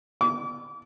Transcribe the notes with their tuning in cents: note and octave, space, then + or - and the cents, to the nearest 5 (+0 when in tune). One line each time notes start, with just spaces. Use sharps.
D6 -35